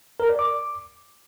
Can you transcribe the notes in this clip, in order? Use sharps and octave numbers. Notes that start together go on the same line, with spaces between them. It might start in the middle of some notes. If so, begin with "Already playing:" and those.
A#4
D5
D6